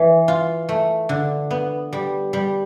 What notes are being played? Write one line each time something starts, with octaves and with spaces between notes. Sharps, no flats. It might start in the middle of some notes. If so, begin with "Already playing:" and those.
Already playing: E3
F4
A3
D3
B3
G3
G3